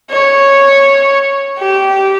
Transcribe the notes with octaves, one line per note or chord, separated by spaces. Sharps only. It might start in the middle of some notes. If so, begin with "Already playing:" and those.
C#5
G4